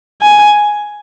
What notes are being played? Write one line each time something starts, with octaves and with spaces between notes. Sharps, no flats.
G#5